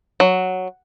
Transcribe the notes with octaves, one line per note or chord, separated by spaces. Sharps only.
F#3